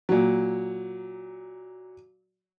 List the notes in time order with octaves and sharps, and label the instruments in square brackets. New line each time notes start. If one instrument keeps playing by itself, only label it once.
[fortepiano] A#2 F#3